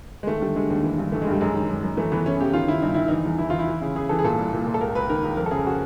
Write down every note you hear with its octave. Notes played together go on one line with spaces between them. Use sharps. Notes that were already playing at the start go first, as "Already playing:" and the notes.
G#3
D#2 A3
D3 G3
D3 G#3
D#2
E3
G2
E3 A3
G#3
G2 G3
F#2 G#3
D#3
F#2
F#2
E3 A3
E3 B3
E3 C#4
C#3 G4
D#3 F4
D#3 E4
G2 D#4
D#3 E4
E3 D#4
E2
E3 E4
E3 F4
E4
E3
C#3
C#3 G#4
E3 A4
G#4
A#2 A4
C2
A#2
A#2
A4
C#2 A#4
C#2 B4
D#3 A#4
C#2
F2 A#4
A4
C#3 G#4
F#4